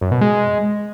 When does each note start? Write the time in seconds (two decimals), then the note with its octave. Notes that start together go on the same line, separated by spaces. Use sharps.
0.01 F#2
0.11 B2
0.21 G#3